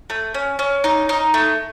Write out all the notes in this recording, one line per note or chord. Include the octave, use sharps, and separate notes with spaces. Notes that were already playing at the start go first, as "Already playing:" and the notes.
A3
C#4
C#4
D#4
D#4
A3